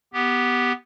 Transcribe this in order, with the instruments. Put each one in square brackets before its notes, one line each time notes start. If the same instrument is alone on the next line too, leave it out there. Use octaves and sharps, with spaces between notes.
[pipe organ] B3 G4